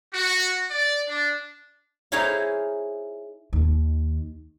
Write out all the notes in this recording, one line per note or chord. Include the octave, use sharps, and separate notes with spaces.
F#4
D5
D4
D#4 E4 G#4 C5 C#5 F5
D#2 D#3